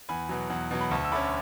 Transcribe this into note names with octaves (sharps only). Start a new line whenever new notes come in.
E2 G#5 B5
B2 F#3
E2
B2 F#3
B5
D2 A5 C#6
E6
D3 A3 C#4 B5 D6